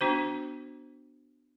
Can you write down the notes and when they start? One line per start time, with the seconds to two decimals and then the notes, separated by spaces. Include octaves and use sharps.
0.01 B3 D4 F#4 C5